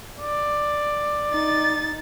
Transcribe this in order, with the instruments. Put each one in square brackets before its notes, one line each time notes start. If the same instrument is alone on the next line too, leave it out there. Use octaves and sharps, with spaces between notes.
[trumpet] D5
[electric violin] D#4 A6